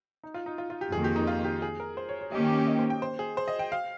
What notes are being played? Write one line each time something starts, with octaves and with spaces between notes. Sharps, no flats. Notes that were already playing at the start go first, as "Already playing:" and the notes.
D#4
F4
D#4
F4
F4
G4
F2 D#3 A#3 G#4
G4
D#4
F4
G4
G#4
A#4
C5
C#5
C#5
D#3 A#3 C#4 G4 D#5
G5
G5
D#5
C5
G5
C5
G#4
C5
D#5
G5
F5